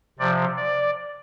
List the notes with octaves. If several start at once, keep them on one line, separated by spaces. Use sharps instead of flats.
C3 F3 D5
D5